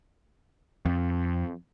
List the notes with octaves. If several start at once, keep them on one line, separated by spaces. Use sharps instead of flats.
F2